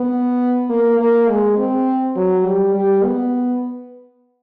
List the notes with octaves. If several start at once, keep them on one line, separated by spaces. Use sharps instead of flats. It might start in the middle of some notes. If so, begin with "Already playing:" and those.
Already playing: B3
A#3
A#3
G#3
C4
F#3
G3
G3
B3